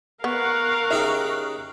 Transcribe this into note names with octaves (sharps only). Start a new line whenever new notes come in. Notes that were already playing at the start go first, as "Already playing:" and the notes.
B3 A#4 F5 C#6 F#6
C#3 D#4 G4 E5